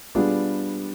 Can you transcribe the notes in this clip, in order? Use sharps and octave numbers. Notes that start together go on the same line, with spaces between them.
G3 B3 D4 F4 G#4